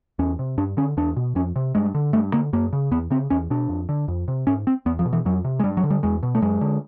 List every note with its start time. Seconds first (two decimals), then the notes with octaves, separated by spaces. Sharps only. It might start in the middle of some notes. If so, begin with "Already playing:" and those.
0.19 E2 C#4
0.39 C3
0.58 G2 D4
0.77 D3 C#4
0.97 E2 D4
1.17 B2
1.35 F2 C#4
1.56 C3
1.75 G2 G#3
1.95 D3
2.13 G2 A3
2.33 D3 A#3
2.53 F#2 A#3
2.73 C#3
2.91 E2 B3
3.10 C#3 C4
3.30 E2 C#4
3.50 B2 D4
3.69 F2
3.89 D3
4.08 F2
4.28 C3
4.47 G#2 C#4
4.67 C4
4.86 E2 B3
4.99 F3
5.06 B2
5.13 E3
5.25 F2 F#3
5.45 C3
5.59 G#3
5.64 G2 G3
5.77 F#3
5.84 D3
5.90 G3
6.03 E2 G#3
6.23 B2
6.35 A3
6.42 F#2 G#3
6.61 D3